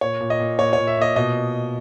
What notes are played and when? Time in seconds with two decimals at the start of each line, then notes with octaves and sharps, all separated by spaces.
0.01 A#2 C#5
0.20 A#2
0.30 D#5
0.40 A#2
0.59 A#2 C#5
0.73 A#2 C#5
0.87 E5
0.97 A#2 D#5
1.16 B2 D#5